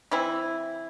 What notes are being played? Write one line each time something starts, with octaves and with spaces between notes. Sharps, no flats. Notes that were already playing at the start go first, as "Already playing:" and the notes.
E3 C4 E4